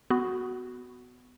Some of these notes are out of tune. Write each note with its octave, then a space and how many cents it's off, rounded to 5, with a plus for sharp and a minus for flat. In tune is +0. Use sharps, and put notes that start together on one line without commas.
B3 +15 F#4 +0